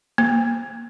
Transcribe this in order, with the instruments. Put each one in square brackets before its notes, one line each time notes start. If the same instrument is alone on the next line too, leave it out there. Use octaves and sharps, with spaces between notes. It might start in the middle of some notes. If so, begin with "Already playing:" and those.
[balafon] A#3